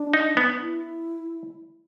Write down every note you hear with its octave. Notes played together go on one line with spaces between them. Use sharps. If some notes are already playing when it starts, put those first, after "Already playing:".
Already playing: D4
D#4
B3
E4